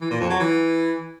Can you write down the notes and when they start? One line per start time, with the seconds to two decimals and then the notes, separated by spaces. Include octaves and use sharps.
0.01 E3
0.11 A#2
0.20 F2
0.30 F#3
0.39 E3